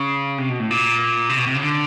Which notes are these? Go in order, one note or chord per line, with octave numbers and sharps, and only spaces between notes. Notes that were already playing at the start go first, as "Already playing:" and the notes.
Already playing: C#3
C3
B2
A2
A#2
C3
B2
C3
C#3
D3